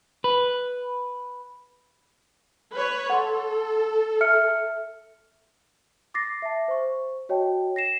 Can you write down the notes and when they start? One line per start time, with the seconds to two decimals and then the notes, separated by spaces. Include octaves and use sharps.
0.24 B4
2.73 B4 C#5
3.10 A4 F#5 C6
4.21 E5 F6 C#7
6.14 D6 A6 A#6 C7
6.42 E5 A5
6.68 C5 C#6
7.29 F#4 C#5 D#5 G5 A5
7.76 A#6 C7 E7